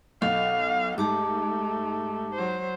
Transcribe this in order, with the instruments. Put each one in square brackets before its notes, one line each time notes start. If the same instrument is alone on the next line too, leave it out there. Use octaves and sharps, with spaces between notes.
[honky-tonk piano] B1 [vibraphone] A4 [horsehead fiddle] F5
[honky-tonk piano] G#2 [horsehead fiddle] A3 [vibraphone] G4 A5 D6
[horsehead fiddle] F#3 C5